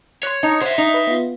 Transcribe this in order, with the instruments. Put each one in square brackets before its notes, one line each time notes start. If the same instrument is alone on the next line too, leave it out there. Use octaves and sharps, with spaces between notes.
[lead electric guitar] C#5 [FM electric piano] C6 F#6
[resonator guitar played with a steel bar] D#4 [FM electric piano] A5 A#5
[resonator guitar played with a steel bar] C5 [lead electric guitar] C#5 E5 [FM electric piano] F#5
[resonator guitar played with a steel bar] D#4
[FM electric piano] B4
B3 F4